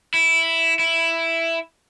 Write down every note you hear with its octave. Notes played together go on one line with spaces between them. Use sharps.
E4
E4